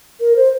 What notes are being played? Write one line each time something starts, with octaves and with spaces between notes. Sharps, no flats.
A#4
C5